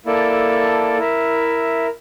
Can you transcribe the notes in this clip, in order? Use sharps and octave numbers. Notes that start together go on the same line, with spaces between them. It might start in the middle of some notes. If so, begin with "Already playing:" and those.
A#3 E4 A4 D5 A5
E4 A#4 E5